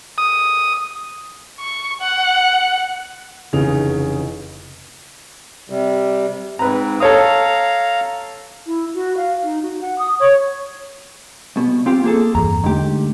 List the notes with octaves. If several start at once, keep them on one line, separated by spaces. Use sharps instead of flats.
D#6
C#6
F#5
F1 C#3 E3 D#4 G#4 F7
C3 G3
G#2 C4 B4 A#5
A4 C#5 F5 A#5 D#6
E4
F#4
F5
D#4
F#4
F#5
D#6
C#5
C2 B2
C4 F4 G4
A#3 G#4 A4
E2 G2 A#5
G#2 D3 A3 G4